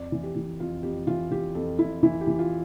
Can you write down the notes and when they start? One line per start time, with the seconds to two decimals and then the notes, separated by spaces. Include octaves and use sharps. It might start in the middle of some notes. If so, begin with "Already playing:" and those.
Already playing: F2 D5
0.12 E3
0.23 G4
0.36 E3
0.60 F2 F4
0.83 F2 G4
1.07 E3 F4
1.31 E3 G4
1.55 F2 A4
1.78 F2 E4
2.03 E3 E4
2.21 G4
2.27 E3
2.39 F4